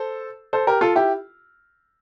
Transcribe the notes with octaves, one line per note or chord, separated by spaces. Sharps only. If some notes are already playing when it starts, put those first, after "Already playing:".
Already playing: A4 C5
A4 C5
G4 A#4
F4 A4
E4 G4